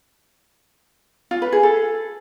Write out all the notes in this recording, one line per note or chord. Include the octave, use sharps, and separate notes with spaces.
F4
B4
G#4
A4